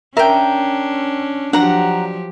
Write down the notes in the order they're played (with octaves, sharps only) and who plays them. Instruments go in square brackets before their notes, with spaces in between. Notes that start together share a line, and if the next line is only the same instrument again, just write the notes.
[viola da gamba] C#4 D4 [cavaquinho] A#4 G5 [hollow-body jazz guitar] E5
[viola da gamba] F3 F#3 G4 [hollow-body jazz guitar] D4 [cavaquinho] F#5 A#5